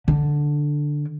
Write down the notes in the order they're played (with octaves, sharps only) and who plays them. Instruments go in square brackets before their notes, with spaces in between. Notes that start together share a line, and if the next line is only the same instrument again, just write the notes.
[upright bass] D3